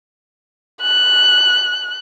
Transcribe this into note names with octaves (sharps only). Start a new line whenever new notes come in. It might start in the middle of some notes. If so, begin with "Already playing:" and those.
F#6